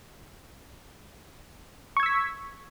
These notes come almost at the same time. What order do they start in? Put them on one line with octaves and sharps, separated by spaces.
C#6 G#6 E6 B6